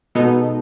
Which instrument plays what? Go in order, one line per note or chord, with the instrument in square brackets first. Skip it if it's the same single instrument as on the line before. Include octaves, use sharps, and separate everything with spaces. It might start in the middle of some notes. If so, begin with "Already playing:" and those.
[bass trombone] B2 [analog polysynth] G#3 B3 D#4 A4